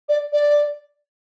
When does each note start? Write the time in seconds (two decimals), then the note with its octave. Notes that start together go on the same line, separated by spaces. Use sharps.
0.08 D5
0.32 D5